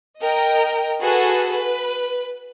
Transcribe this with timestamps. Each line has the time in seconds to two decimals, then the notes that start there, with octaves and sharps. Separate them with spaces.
0.20 A#4 D#5 G5
1.01 F#4 G#4 A4 B4
1.52 B4